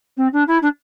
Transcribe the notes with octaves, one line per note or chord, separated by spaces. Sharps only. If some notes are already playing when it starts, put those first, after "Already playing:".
C4
D4
E4
D4